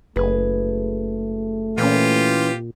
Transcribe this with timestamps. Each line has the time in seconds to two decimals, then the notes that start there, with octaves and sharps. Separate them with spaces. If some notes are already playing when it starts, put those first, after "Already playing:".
0.16 F#1 A3 G#4 B4
1.78 A#2 E3 C#4 F4 G4